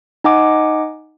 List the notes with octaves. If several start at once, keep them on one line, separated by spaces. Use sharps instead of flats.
D#4 D#5 F#5 G#5 D6